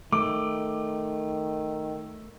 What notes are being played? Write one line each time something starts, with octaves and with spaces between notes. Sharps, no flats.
D#3 A3 D6